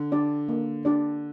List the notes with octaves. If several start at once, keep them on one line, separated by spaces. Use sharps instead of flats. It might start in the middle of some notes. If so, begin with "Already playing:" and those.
Already playing: D3
D4 G4 D5
A#3
D4 G4 D5